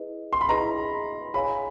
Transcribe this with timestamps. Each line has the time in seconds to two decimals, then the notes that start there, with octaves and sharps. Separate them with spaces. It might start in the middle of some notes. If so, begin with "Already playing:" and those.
Already playing: E4 G#4 B4 D#5
0.33 C6
0.41 B5
0.49 E4 G#4 B4 D#5 A#5
1.34 G#4 C#5 F5 G#5 B5